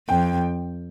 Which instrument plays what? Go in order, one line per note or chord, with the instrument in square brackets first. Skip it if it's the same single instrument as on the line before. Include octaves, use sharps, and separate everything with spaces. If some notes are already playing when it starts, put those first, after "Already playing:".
[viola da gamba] F2 [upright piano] G5